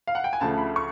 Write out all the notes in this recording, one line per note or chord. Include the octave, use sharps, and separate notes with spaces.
F5
F#5
G5
G#5
D2 C#3 F3 A3 A5
B5
C#6